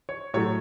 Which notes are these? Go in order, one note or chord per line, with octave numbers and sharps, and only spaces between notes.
C#5
A2 F#3 A3 C#5